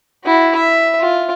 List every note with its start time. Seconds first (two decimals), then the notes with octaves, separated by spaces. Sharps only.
0.25 E4 F#4
0.55 E5
1.00 F4